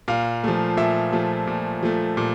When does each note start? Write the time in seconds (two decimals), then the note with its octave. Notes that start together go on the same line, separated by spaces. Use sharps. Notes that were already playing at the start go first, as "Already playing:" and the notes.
0.08 A#2 F5
0.44 F3 A3
0.77 A#2 E5
1.12 F3 A3
1.47 A#2
1.83 F3 A3
2.17 A#2